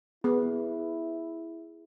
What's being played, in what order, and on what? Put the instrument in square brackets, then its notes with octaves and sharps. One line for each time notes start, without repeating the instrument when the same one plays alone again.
[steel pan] B3 [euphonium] E4 [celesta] G#4